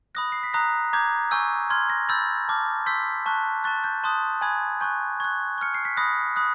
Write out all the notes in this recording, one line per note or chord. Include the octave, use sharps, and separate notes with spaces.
B5 D#6 F#6 A#6
C7
B6
A#5 D#6 F#6 A#6
A#5 D6 G6 G#6
G#5 C#6 E6 G6
C6 F6 G#6
A#6
B5 E6 G6 A6
A5 D6 F6
C6 E6 G6 B6
A5 C#6 F#6
A5 C#6 F#6 A6
G6
A5 C6 D#6 F#6
G#5 B5 D#6 F#6 G#6
G#5 C#6 F#6 G6
C#6 F#6 G#6
C#6 F6 C#7
C7
B6
B5 D#6 F#6 A#6
B5 D#6 F#6